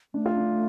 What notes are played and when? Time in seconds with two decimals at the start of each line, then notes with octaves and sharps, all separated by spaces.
0.14 A3 D4
0.26 F4
0.37 D4